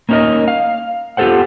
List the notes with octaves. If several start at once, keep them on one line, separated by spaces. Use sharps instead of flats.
A#3 C#4 D#4 E4 A#4 D#5
F5
B3 F4 G4 A4 C5 F#5